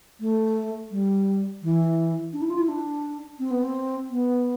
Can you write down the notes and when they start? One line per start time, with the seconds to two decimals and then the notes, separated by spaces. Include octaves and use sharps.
0.20 A3
0.91 G3
1.63 E3
2.33 D4
2.42 E4
2.50 F4
2.59 E4
2.69 D4
3.39 C4
3.51 B3
3.63 C4
4.10 B3